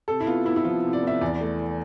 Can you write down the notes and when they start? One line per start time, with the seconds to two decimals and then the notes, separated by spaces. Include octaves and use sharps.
0.08 C3 A4
0.20 E4
0.27 B3 F4
0.46 B3 E4
0.56 E4
0.65 F3 F4
0.84 C3
0.93 D5
1.02 B3 E5
1.21 E2 D5
1.41 A3